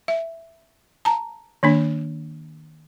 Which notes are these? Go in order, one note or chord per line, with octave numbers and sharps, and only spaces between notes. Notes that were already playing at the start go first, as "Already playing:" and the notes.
E5
A5 A#5
D#3 A#3 D4